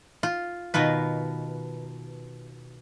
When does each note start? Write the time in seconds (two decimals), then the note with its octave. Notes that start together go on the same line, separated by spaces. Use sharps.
0.23 F4
0.74 B2 D#3 F4 B4